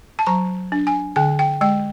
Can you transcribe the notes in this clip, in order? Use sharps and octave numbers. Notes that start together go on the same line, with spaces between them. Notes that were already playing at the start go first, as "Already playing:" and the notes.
A5
F#3 A#5
D4
G#5
D3 G5
G5
G#3 G5